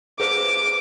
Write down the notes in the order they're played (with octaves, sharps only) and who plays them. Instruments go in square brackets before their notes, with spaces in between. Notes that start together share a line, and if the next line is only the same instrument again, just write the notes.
[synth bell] G#4 B4 C5 [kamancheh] D6